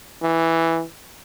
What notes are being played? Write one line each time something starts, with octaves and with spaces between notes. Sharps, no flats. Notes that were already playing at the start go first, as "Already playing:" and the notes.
E3